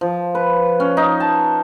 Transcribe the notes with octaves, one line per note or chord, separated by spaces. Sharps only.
F3
B4
C#4
D#4
A5